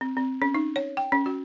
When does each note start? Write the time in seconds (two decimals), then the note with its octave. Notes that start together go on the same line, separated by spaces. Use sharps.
0.01 C4
0.17 C4
0.42 C#4
0.54 D#4
0.76 C#5
0.97 G5
1.12 C#4
1.26 F#4